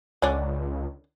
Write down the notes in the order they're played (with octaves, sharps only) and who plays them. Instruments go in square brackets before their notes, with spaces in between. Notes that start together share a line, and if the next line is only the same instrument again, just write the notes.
[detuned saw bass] C#2 [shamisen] D3 C#4 D4